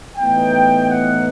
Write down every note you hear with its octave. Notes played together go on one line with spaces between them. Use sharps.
A2 E3 B3 D#4 G5
F#5